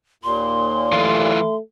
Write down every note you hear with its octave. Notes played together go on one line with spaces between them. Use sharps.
D#2 A#2 C6
E3 A3 F4